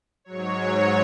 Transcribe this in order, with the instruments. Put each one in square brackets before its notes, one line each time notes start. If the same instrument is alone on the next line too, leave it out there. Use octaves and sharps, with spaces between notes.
[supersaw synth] G#2 F#3 C#5